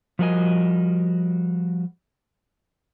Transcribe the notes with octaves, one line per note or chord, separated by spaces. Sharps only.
F3 G3 F#4 A#4 D#5 G#5